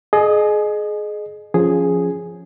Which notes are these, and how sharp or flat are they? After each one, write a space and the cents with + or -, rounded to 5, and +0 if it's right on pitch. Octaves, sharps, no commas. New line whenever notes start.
G#4 +25 D#5 -25
F3 +0 C#4 +0 G#4 +0